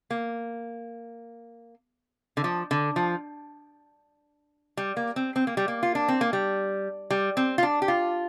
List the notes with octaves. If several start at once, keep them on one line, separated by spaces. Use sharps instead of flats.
A#3
D3
F3
D3
F3
G3
A#3
C4
C4
A#3
G3
A#3
F4
D4
C4
A#3
G3
G3
C4
F4
D4
G4
F4